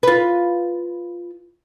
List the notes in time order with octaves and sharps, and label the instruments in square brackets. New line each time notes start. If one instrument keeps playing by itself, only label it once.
[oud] F4 B4